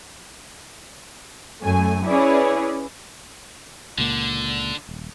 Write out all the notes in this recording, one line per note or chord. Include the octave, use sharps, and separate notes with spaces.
F#2 A3 G#5
C#4 E4 G#4 B4 C#5 D5
C#2 A#2 D3 A#3
D#1